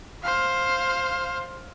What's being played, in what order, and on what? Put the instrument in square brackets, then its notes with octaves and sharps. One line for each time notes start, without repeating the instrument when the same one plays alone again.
[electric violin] C5 F5